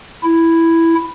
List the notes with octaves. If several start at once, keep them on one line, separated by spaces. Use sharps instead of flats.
E4